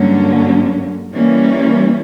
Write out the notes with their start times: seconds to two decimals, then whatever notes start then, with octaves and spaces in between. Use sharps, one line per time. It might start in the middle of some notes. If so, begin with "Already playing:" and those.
Already playing: G2 D3 F#3 A#3 C#4
1.12 E3 G3 A#3 C#4